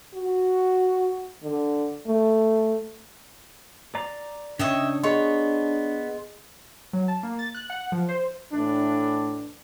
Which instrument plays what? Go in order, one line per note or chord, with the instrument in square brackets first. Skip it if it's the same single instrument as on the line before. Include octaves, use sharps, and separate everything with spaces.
[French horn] F#4
D3
A3
[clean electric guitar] D5 A#5
[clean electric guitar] C#3 C#5 [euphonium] D4 [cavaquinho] D#5 E5 G5
[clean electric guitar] B3 [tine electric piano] G#4 D#5 C6 [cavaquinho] C#5
[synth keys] F#3
A5
A#3
A6
F#6
F#5
F3
C5
[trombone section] A2 E3 D4